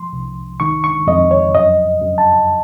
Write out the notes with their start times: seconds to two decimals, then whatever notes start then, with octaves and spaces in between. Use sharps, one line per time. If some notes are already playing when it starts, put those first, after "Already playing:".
Already playing: F3 C6
0.13 C2
0.60 D#3 C#6
0.84 C#6
1.07 F2 D#5
1.31 C#5
1.55 F#2 D#5
2.01 F#2
2.18 A5